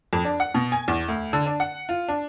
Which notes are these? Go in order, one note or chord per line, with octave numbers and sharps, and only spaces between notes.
F2
D4
F#5
B2
G#5
E2
D2
D3
D4
F#5
F4
D4